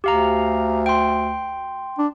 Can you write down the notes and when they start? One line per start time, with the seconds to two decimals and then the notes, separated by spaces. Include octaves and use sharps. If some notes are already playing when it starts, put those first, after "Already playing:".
0.04 D2 G4 F5 A#5
0.86 G5 C6
1.98 D4